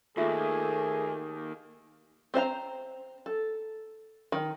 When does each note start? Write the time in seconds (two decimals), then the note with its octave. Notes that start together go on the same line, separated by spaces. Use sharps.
0.17 D#2 A3 F4 G#4 E5
2.34 C4 C5 F5 A#5
3.26 A4
4.32 D#3